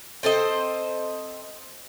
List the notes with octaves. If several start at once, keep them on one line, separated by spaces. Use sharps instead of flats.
C4 A4 C5 D#5